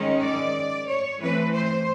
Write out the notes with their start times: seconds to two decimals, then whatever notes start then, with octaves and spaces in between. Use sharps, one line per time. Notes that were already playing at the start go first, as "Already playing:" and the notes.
Already playing: D#3 G#3 C#4
0.22 D5
0.87 C#5
1.20 E3 A3 C4 B4
1.53 C5